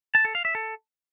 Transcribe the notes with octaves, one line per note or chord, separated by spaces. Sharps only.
A5
A4
F5
E5
A4